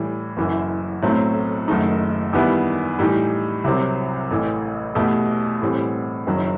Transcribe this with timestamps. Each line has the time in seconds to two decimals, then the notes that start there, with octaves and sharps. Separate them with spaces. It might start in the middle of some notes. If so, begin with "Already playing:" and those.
Already playing: A2 E3 G3
0.37 F#1 F#2 E3
1.02 B1 A2 F#3 A3 C4
1.68 F#1 F#2 D#3 A3 D#4
2.33 E2 D#3 G3 B3 E4
2.99 A2 E3 G3 D#4 G4
3.64 C2 C3 F#3 C4
4.31 A1 A2 E3
4.95 E2 B2 A3 E4 G4
5.62 A2 E3 G3 C4
6.27 F#1 F#2 D#3 F#3